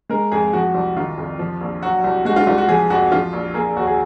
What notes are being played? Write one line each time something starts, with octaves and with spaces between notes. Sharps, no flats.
G#3 A#4
F2 G#4
F3 F#4
C2
D#3 F4
F2
F3
A#1
F#3 F#4
C2
G#3 F#4
F4
C2 F4
F#4
F3 G#4
F2 F#4
F3 F4
A#1
A#3 G#4
D#2 F#4
G#4